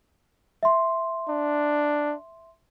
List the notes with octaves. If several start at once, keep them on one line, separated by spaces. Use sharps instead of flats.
E5 C6
D4